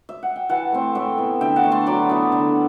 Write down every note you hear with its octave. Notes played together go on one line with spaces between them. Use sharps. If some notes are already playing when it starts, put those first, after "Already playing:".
E5
F#5
G5
E3 F#5 A5
A3 C4
A2 E5 G5
E3 B3
D3 E5 G5
F#5 A5
A3 D4
A5 C6
F#3 B5 D6
B3 E4
D3